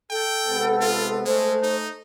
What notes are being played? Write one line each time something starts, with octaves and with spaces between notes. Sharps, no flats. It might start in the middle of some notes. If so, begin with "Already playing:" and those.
A4 G5
C3 G#3 B3
F4
G#3 A3 C5
D#4